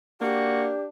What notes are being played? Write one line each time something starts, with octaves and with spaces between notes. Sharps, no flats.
A#3 D4 F#4 G4